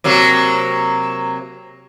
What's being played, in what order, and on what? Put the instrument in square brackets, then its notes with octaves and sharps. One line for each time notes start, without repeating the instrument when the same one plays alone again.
[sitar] C3 F#3 A#3